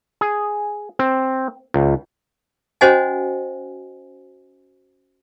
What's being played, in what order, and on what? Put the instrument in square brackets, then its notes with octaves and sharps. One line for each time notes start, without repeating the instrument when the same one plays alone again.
[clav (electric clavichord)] G#4
C4
C#2
[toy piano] C#4 F#4 C5 D#5 F#5 G#5